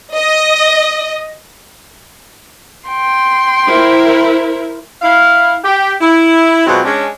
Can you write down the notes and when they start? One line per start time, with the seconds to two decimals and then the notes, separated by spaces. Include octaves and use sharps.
0.17 D#5
2.88 G5 C6
3.68 E4 A#4 C5
5.02 E4 F5
5.64 G4
6.01 E4
6.66 B2 F#3 G#3 C4 F4 F#4
6.85 G#3 C#4 D4